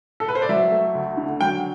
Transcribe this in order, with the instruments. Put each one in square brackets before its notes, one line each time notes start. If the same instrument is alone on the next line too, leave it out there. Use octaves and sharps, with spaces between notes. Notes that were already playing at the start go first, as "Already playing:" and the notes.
[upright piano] A4
B4
C5
D5
F#3 E5
A3
D2
D3
F#3 G5